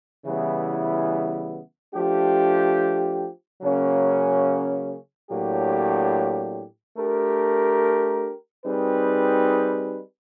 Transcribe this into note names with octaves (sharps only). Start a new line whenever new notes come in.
C#3 E3 G3 B3 E4
F3 A3 D4 G4
C#3 F#3 A#3 C#4
A2 F#3 A#3 D4 G4
A3 D4 G4 A#4
G3 C4 D#4 G#4 B4